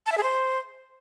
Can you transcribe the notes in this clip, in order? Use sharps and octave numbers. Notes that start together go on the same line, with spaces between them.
A5
E5
G#4
C5